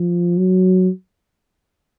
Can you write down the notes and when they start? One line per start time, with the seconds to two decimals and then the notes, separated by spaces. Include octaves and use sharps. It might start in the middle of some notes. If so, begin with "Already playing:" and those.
Already playing: F3
0.38 F#3